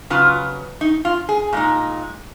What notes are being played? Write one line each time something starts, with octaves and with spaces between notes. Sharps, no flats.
C#3 F#3 B3 F4
D#4
F4
G#4
A#2 G#3 D#4